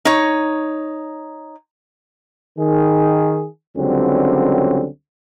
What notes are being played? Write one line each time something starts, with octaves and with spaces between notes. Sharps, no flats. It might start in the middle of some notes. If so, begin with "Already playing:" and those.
D#4 C#5
D#3 G#4
C#2 D3 F#3 G3 C4 C#4